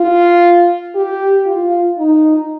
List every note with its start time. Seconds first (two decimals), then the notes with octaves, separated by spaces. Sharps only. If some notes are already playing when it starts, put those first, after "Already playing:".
Already playing: F4
0.95 G4
1.46 F4
1.98 D#4